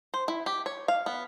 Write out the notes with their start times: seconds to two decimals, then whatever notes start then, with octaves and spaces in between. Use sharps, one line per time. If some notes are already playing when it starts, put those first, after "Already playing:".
0.14 C5
0.28 E4
0.46 G4
0.66 C#5
0.88 F5
1.06 B3